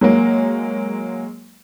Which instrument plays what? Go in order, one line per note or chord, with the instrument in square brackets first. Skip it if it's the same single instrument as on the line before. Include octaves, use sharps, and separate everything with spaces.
[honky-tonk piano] F#3 G#3 A#3